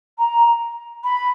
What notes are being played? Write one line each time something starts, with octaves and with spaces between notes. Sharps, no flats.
A#5
B5